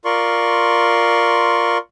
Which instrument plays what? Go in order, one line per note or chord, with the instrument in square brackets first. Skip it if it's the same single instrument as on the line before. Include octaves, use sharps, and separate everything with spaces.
[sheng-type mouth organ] F4 A#4 D5 C6 C#6